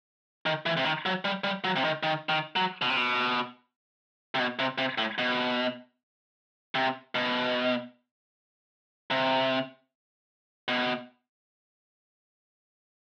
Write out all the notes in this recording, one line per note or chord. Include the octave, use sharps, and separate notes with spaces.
D#3
E3
C3
D#3
F#3
G3
G3
F#3
C3
D#3
D#3
D#3
F#3
B2
C3
B2
C3
B2
C3
C3
A2
B2
C3
B2
C3
B2